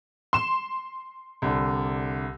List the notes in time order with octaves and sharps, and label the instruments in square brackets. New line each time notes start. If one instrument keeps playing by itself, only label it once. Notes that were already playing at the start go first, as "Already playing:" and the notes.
[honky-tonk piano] C6 E7
[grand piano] C2 D3